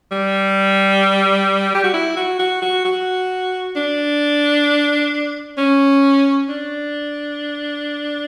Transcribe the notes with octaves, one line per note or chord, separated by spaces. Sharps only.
G3
G4
F#4
E4
F#4
F#4
F#4
F#4
D4
C#4
D4